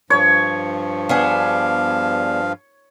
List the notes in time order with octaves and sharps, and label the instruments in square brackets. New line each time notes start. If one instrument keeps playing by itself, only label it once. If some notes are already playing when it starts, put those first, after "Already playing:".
[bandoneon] G2 F3 [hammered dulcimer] C#5
[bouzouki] B3 D4 G#4 [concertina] F5